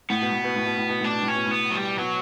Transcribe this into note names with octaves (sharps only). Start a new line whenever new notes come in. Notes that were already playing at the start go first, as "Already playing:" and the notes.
A2 B3
B2
A2
B2
A2
B2
A2
B2
A2 D4
B2
A2 C#4
B2
A2 B3
F#3
G3
B2 F#3